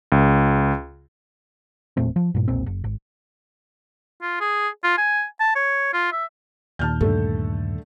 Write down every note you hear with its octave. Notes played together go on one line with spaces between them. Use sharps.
C#2
E1 A#2 A3 C4
F3
G2 A#2
E1 B1 A#2 C4
F#1
G#1
F4
G#4
F4
G#5
A5
C#5
F4
E5
D#2 A#2 D#3 A5 F6 G6
G2 D3 A3 A4